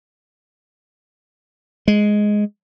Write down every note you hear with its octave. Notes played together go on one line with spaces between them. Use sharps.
G#3